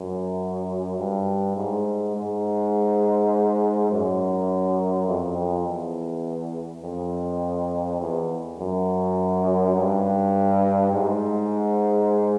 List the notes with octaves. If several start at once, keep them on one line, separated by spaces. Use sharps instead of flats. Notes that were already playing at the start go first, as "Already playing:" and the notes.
Already playing: F#2
G2
G#2
G#2
F#2
F2
F2
E2
F2
E2
F#2
G2
G#2